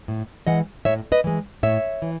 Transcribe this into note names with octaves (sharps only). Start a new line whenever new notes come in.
A2
E3 G#3 D#5 F#5
A2 C#5 E5
B4 D#5
E3 G#3
A2 C#5 E5
E3